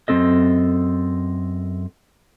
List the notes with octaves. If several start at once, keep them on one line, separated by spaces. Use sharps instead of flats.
F#2 G3 C4 A4 D#5